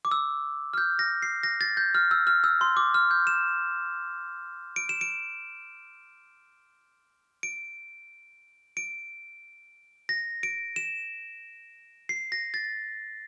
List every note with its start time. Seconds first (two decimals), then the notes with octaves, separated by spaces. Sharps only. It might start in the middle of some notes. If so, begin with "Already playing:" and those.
0.05 D6
0.11 E6
0.74 F6
0.78 G6
0.99 A#6
1.22 C7
1.43 A#6
1.61 A6
1.77 G6
1.95 F6
2.11 E6
2.27 F6
2.44 E6
2.61 C6
2.77 D6
2.94 F6
3.11 G6
3.27 E7
4.76 D7
4.89 E7
5.01 D7
7.43 D7
8.77 D7
10.09 A#6
10.43 D7
10.76 E7
12.09 C7
12.32 A#6
12.54 A6